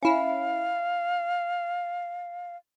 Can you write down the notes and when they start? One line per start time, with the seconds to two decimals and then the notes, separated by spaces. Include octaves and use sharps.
0.03 C#4 E4 F5